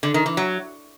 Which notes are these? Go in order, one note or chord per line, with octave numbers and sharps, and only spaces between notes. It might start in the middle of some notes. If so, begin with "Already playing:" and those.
D3
D#3
E3
F#3